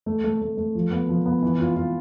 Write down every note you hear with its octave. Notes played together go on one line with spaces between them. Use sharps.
A3
A3
A3
A3
F3
B3
F3
B3
E3
F4
F4